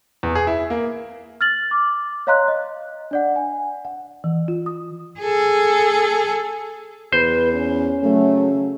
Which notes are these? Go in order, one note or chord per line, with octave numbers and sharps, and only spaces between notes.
E2
G#4
E4
A#3
F6 A6 F#7
D6
C#5 D#5 F5 A#5 C6 F#6
D#5
D4 D5 F#5
G#5
F#5
E3
F4
D#6
G#4 A4
E2 B4 C5
C#4
C#3 F#3 A3